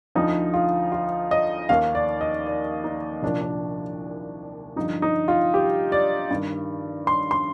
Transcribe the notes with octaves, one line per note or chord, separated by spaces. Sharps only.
D2 D3 F3 D#4
F4
F4
D#5
D#2 D#3 F5
D5
D#5
D5
D#4
C2 A#2 F3 D4
D4
G2 D3 F3 D#4
D#4
F4
G4
D5
G2 D#3
C6
C6